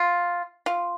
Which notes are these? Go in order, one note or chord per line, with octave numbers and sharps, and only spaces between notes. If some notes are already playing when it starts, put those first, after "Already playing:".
Already playing: F4
F4